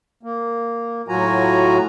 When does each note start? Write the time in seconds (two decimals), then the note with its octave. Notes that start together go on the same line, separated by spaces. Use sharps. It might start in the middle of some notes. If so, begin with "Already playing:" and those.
0.23 A#3
1.08 A2 F#3 F4 F#4 G#5 A#5